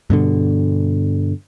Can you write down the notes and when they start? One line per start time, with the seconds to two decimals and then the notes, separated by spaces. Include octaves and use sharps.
0.10 G2 B2 D3